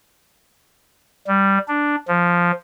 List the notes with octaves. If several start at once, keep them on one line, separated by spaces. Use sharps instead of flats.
G3
D4
F3